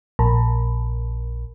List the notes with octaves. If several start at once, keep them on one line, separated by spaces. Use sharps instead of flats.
A#1